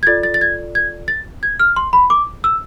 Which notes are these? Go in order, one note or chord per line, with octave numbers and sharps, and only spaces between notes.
G#6
F4 A4 D5 A6
A6
A6
G#6
G#6
A6
G#6
F6
C6
B5
D6
E6